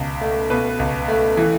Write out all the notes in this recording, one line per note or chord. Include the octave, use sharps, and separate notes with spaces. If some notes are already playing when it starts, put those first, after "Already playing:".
Already playing: C#2 B2
A3
B2 B4
C#2
A3
E3